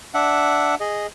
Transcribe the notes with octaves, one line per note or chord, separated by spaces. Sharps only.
D4 E5 F#5
G#4 D#5